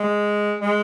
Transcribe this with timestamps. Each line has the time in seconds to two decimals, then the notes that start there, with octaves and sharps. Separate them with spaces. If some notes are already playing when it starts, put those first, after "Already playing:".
Already playing: G#3
0.61 G#3